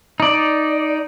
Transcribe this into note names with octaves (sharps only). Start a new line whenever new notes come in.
D#4 D5